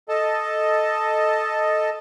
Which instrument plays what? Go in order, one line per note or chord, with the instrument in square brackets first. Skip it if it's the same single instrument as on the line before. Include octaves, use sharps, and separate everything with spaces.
[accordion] A4 D#5 A5